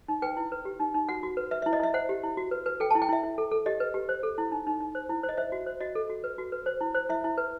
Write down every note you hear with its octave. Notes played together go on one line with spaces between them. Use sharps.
D#4
B4 G5
E4
B4
G4
D#4
D#4
F#4 F#5
F#4
B4
B4 E5
E4 E5
D#5
E4 E5
C5 F#5
G4
E4
F#4
B4
B4
A4 G5
E4 A5
G5
E4 E5
E4
A4
A4
G4 D#5
B4
G4
C5
A4
E4
D#4
D#4
D#4
C5
E4
C5
D#5
C5 E5
F#4
C5
F#4 D#5
A4
F#4
B4
F#4
B4
C5
E4
C5
E4 E5
E4
B4